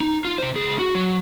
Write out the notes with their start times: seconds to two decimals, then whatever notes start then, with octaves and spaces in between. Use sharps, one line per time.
0.01 D#4
0.25 F4
0.38 C3 C5
0.54 C#2 G#4
0.79 F#4
0.95 F#3